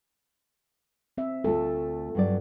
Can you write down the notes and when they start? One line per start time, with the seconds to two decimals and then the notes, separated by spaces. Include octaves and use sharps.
1.18 C4 E5
1.44 D2 A3 F4 A4
2.15 G2 F#3 D5